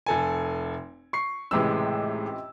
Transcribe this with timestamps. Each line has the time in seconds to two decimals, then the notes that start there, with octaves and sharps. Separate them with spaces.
0.06 F1 A4 G#5
1.13 C#6 C7
1.51 C#2 A2 C3 E3 G#3 E6